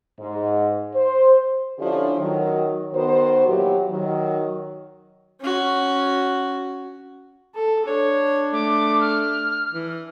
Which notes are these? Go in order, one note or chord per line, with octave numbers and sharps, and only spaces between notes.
G#2
C5
D3 F3 C#4 D4 E4 G4
D#3 F#3
D#3 B3 F#4 A#4 C5
A#2 E3 F#3 F#4 G4
D#3 F#3
C#4 F#4
A4
D4 C#5
A3 D6
F6
E3